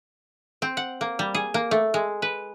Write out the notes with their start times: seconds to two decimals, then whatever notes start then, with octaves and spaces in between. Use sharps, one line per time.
0.62 C4
0.77 F#5
1.01 A#3
1.19 G3
1.34 G#4
1.54 A#3
1.71 A3
1.94 G#3
2.22 B4